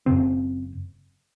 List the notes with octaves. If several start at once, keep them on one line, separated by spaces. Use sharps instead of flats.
F#1 F#2 C#3 C4